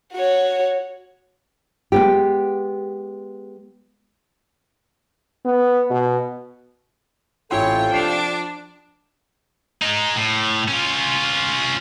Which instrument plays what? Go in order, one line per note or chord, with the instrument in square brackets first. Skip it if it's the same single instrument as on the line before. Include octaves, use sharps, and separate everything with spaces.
[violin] F#4 C#5
[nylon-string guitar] G#3 B3 G4
[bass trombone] B3
B2
[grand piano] A1 E4 C6 [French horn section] C3 F4 A4 [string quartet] C#5 [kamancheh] G5
[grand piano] F3 C7 F7 [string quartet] D4
[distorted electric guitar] G#3 D#4
A2
C#4 F4